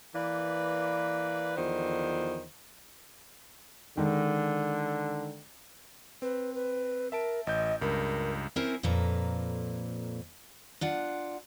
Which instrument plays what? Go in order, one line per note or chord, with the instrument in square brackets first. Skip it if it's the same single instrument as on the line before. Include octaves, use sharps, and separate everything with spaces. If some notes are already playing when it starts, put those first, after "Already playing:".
[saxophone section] E3 A#3 B4 D5
E2 D3 D#3 F3 C5
[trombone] D3 [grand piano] D#3 G#3
[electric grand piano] C4 [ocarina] B4
[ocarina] B4
[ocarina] A#4 [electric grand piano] E5 A5 D7
[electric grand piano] A1 G6 [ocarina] D#5
[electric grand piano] C#2 G2 [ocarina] A#4
[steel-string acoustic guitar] C4 C#4 E4 A#4 C5
F2 A#2 A4 B4 A#5
D4 F4 F#5